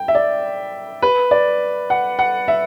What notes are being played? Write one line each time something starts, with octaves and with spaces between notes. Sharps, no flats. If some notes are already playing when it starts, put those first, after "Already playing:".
Already playing: G5
E5
D5
B4
D5
F#5
F#5
E5